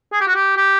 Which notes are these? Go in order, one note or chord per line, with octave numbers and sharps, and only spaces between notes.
G#4
G4
F#4
G4
G4